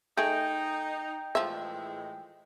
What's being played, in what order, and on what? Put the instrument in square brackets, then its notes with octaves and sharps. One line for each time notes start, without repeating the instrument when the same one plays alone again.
[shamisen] A3 G#4 [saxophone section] D#4 [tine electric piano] G5
[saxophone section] A2 E3 G#3 [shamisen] F3 E5